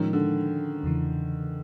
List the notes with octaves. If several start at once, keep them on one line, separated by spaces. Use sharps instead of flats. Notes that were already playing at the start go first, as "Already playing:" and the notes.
Already playing: A2 D#3 F3 G#3 C#4
D3
E2 C#3 E3